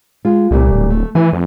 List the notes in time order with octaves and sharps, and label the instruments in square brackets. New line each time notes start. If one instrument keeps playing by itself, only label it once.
[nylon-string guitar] G#3 F4
[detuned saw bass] C2 [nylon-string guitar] A#2 G3 A3
[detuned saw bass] D1
[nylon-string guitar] A3
[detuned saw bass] E3 [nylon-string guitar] B4 G#5
[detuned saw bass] F2